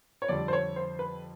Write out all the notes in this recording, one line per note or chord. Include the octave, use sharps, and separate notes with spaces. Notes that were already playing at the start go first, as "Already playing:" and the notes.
C#5
F2 D3 G3 D5
C5
C#5
C5
B4